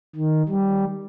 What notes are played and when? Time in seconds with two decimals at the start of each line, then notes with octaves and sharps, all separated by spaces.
0.16 D#3
0.49 G3